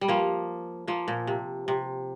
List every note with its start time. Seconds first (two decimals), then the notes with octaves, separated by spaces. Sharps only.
0.01 G3
0.08 F3 A#3
0.87 F3 A#3
1.08 A#2
1.27 C3
1.68 C3